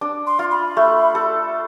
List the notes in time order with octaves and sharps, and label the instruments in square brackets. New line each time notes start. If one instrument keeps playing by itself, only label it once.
[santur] D4
[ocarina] C6
[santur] F4
[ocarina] B5
[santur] A3
A4